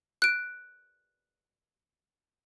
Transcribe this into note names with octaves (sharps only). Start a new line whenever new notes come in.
F#6 D7